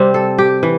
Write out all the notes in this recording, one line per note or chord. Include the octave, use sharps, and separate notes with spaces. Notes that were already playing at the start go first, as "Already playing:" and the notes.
Already playing: C3 G3 C4
A4
G4
E3